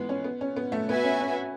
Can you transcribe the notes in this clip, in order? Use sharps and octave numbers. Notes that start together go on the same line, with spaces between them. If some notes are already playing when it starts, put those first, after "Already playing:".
Already playing: E3 G#3 B3
C#4
B3
C#4
B3
A3
B3 F#4 B4 E5 G#5
C#4
C#4